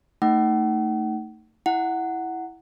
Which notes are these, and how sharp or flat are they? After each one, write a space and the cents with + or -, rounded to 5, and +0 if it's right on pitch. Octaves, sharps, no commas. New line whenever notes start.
A3 +25 D#4 +0 F#5 +40
E4 +0 F#5 +0